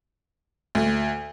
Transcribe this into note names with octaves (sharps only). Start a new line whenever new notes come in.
D2